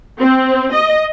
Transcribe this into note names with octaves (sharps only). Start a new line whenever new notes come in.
C4
D#5